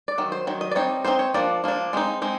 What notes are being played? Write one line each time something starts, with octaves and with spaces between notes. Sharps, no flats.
D5
D#3 F#3
C5
D#3 F#3
D#5
D5
G3 C4 D#4 C#5
G3 C4 D#4 C5
C#5
F3 A#3 D4 D5
F3 A#3 D4
G#3 C4 D#4
G#3 C4 D#4